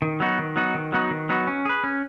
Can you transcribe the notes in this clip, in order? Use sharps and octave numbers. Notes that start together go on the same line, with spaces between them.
D#3
F#3 B3 D#4 F#4
D#3
F#3 B3 D#4 F#4
D#3
F#3 B3 D#4 F#4
D#3
F#3 B3 D#4 F#4
C#4
G#4 B4
C#4